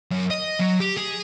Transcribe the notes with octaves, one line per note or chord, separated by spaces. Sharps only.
F#2
D#5
F#3
G4
G#4